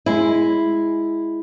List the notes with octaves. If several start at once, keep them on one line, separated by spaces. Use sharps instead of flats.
G#3 E4